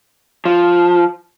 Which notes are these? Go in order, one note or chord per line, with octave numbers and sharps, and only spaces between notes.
F3